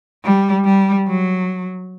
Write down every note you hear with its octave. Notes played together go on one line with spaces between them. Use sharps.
G3
G3
F#3